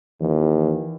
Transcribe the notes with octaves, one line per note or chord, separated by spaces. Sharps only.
D#2 E3